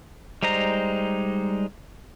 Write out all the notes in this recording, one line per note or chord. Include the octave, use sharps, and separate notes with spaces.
G3 G#3 D#4 C5 A#5